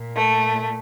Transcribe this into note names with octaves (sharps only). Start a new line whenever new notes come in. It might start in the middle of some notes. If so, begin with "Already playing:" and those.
Already playing: A#2
A3